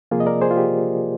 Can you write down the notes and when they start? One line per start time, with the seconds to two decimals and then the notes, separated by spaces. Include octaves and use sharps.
0.11 C3 F3 A#3 F4 G#4
0.20 D#5
0.26 A#4 D5
0.41 G#4 C5
0.51 F4
0.57 G4